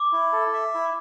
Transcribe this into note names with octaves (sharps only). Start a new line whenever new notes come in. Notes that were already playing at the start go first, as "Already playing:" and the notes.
Already playing: D6
E4
A4
E5
E4